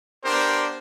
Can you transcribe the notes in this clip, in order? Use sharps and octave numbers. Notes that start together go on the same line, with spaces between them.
B3 D4 G4 A#4 C5